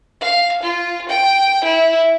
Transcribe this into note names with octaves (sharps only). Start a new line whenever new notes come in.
F5
F4
G5
E4